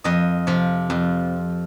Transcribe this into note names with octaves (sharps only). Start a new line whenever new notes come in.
F2 D#5
C3 F3
F2